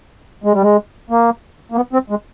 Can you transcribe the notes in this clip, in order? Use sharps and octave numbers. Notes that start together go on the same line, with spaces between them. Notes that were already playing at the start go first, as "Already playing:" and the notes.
G#3
G3
G#3
A#3
A#3
B3
C4
G#3